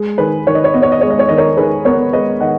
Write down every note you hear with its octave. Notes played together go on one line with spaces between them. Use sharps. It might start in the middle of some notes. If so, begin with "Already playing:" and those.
Already playing: G#3
D#3 G#4 B4
D#3 C#5
D#5
C#5
B3 D#5
C#5
D#5
G#3 C#5
D#5
C#5
D#3 D#5
A#4 C#5
D#3 G#4 B4
B3 A#4 C#5
G#3 B4 D#5
D#3 D#5 F#5